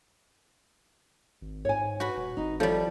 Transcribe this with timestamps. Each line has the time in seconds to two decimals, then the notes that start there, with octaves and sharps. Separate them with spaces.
1.41 G#1
1.65 G#2 C#5 G#5
2.00 F#4 B4
2.16 D#1
2.37 G#1 D#4
2.60 F3 G3 E4 A4 C#5